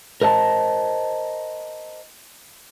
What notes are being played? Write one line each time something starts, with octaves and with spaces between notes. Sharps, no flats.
A#4 C5 D#5 A5